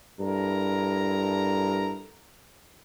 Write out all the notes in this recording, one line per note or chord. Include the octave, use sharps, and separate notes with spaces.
G2 E4 A4 A#4 A#5